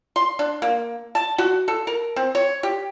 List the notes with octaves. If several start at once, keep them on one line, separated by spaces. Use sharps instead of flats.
C6
D4
A#3
A5
F#4
A4
A#4
C4
C#5
G4